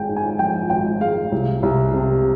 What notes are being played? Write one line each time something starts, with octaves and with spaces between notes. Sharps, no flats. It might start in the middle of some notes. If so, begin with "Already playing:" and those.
Already playing: G#1 G#3 G5 G#5
G#2
G#5
F3 G5
G#1 G5
G#3 F5
C2
C2
C3